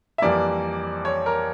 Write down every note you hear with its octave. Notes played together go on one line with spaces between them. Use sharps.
E5
F2 E3 G3 A#3 D5
C#5
A#4